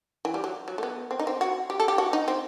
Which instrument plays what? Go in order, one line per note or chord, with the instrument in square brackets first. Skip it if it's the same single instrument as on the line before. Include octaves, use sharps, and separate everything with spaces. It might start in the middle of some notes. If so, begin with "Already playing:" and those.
[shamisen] E3
G3
F#3
F#3
A3
B3
C4
D#4
C4
F#4
G4
A4
G4
F#4
D#4
C4